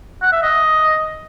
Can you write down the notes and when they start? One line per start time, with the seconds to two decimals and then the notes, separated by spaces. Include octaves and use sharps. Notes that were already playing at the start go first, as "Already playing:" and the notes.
0.22 F#5
0.32 E5
0.43 D#5